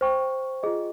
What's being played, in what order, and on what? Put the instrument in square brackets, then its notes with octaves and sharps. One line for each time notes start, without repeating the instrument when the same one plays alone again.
[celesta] C5 G5 C#6
F4 G#4 D#5